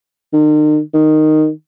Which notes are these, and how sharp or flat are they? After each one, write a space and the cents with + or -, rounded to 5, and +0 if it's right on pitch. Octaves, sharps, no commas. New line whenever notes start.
D#3 -40
D#3 -10